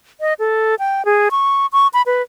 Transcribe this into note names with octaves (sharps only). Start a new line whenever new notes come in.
D#5
A4
G5
G#4
C#6
C#6
B5
B4